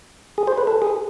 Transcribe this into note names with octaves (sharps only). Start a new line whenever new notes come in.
G#4
C5
B4
A4
G#4